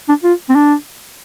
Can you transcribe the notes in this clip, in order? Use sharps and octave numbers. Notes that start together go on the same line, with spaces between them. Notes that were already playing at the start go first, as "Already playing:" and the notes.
D4
F4
C4
D4